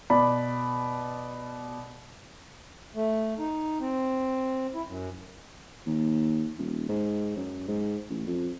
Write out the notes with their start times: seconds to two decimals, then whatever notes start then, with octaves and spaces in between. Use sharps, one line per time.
0.10 B2 D5 B5
2.95 A3
3.38 D#4
3.80 C4
4.74 E4
4.86 F#2
5.87 D#2
6.58 D#1
6.89 G#2
7.36 F#2
7.68 G#2
8.10 A1
8.27 F2